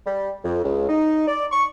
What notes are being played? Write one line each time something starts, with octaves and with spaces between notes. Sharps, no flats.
G3
F2
C#2
D#4
D5
C#6